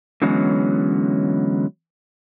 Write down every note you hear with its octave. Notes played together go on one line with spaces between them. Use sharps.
D3 E3 F#3 G#3 B3 C#4